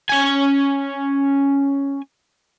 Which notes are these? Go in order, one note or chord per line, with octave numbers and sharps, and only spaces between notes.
C#4 G#5